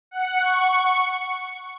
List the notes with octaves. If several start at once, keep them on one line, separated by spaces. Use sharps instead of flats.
F#5
C#6